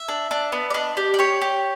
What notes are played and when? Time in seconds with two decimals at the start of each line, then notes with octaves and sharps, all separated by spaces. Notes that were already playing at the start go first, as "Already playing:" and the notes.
Already playing: E5
0.08 D4
0.31 D4
0.52 B3
0.70 D5
0.74 D4 D#5
0.97 G4 D5
1.14 D5
1.19 G4 C#5
1.42 G4